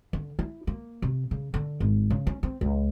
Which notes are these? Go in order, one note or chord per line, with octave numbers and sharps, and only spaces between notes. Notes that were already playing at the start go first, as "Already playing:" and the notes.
D3
E4
A#3
C3
C#3
D3
G#1
C#3
C#4
C4
C#2